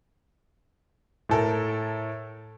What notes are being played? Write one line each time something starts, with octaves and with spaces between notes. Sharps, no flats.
A2 A4 A#4